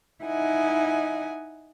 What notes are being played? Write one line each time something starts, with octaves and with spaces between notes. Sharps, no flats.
D#4 E4 D#5 F#5 G#5